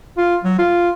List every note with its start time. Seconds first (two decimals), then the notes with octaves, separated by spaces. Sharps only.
0.18 F4
0.44 F#3
0.58 F4